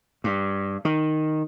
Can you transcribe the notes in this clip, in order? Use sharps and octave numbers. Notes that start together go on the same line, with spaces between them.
G2
D#3